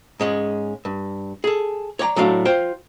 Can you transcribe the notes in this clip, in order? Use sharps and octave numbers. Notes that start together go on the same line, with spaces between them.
G#2 G#3 C#4
G2
G#4 A4
C#5 D5 G5 A#5
A2 F#3 A3 D4 F5
F4 C5 G5